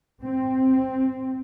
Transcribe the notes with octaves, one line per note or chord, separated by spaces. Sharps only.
C4